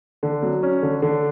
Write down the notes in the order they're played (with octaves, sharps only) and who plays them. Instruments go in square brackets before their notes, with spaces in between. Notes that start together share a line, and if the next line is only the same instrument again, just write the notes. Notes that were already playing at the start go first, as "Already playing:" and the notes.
[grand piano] D3
F#3
C#4
D3
D3